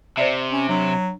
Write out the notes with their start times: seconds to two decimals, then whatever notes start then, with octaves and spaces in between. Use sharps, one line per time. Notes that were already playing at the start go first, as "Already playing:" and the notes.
0.17 C3 C5 D5 E5
0.51 C#4
0.69 F#3 D4